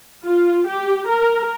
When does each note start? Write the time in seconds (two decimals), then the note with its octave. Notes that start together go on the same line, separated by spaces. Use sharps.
0.24 F4
0.66 G4
1.08 A#4